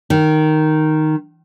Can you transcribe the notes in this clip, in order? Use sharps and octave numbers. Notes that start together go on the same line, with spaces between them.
D#3